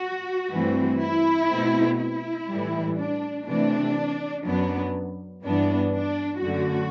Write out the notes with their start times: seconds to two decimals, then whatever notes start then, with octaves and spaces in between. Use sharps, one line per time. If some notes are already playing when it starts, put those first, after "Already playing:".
Already playing: F#4
0.52 G2 E3 A3 C4
1.01 E4
1.51 B2 A3 C4
1.99 E4
2.49 A2 E3 G3
2.98 D4
3.47 C3 E3 A3 D4
4.45 F#2 F#3 B3 D4
5.44 G2 E3 B3 D4
5.93 D4
6.42 F#2 D3 A3 F#4